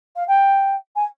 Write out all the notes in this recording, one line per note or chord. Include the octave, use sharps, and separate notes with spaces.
F5
G5
G#5